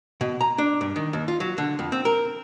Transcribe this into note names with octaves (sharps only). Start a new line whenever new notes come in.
B2
A#5
D4
G2
D#3
D#2
F4
F#3
D3
F2
C4
A#4